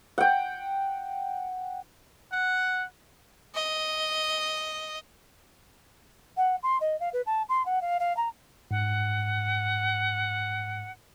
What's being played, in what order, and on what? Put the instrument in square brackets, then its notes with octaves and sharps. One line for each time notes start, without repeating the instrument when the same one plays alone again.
[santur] F#5 G5
[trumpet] F#5
[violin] D#5
[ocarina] F#5
C6
D#5
F5
B4
A5
C6
F#5
F5
F5
A#5
[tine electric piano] G#2 [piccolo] F#5